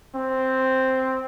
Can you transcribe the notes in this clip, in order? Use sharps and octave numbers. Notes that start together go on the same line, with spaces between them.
C4